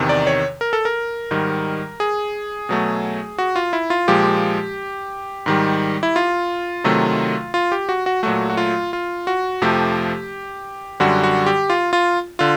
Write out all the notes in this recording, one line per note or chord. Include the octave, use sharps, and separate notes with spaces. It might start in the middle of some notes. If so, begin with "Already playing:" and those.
Already playing: E2 C3 D#3
D5
C#5
A#4
A4
A#4
G#2 D#3 G3
G#4
B2 F#3 A3
F#4
F4
E4
F4
A#2 F3 G#3 G4
G#2 D#3 G3
E4
F4
C3 D#3 F#3 A3
F4
G4
F#4
F#4
A#2 F#3 A3 F#4
F#4
F4
F4
F#4
F2 C3 F3 A3 G4
F#2 D3 G3 F#4
F#4
G4
F4
F4
D3 F4